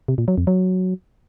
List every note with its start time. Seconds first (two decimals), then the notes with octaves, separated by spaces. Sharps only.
0.08 C3
0.18 A#2
0.28 F#3
0.38 F2
0.47 F#3